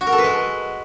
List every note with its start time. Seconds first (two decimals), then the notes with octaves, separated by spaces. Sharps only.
0.01 F#4
0.07 A#4
0.12 A4
0.18 B4
0.24 G#3